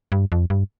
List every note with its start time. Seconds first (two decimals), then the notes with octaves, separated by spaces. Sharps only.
0.12 G2
0.32 F2
0.50 G2